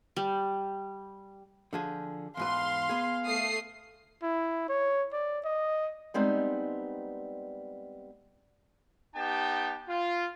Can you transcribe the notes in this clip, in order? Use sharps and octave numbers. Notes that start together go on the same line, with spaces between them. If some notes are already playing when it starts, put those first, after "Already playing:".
G3
D3 F3 G#4
E2 G#2 B4 F5 C6
B3 G#4
A3 D#6 C7
E4
C#5
D5
D#5
G3 G#3 B3 C4 D#4
B3 D#4 G4 G5 A5
F4